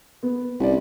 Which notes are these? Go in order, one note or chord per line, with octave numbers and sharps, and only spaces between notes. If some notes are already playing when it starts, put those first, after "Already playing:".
B3
C2 C#4 D5